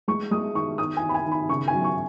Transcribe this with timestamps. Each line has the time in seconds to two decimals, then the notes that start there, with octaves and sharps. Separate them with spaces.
0.08 G#3 C#6
0.31 G#3 D#6
0.55 D#3 C#6
0.78 D#3 D#6
0.97 G#5
1.02 D#3
1.09 B5
1.14 G#5
1.26 D#3
1.32 B5
1.49 C#3 C#6
1.68 G#5
1.74 F#3
1.84 C#6